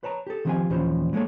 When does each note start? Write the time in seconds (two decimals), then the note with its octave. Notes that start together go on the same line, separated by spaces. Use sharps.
0.03 B4 C#5 A5 A#5
0.27 G4 A4
0.45 D#3 F3 C4 E4 G4 G#5
0.70 D#2 A#2 E3 F3 C#4 C5
1.13 F#3 G#3 A#3 A4 C#5